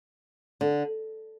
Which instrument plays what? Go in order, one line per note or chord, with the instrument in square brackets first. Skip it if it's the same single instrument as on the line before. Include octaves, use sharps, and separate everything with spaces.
[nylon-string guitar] D3